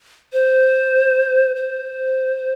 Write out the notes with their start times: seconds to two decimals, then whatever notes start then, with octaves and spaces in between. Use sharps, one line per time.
0.33 C5
1.56 C5